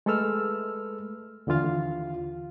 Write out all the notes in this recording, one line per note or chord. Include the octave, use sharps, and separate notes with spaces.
G#3 A3 A4 B4 E6 F6
D#2 D3 E3 F4 F5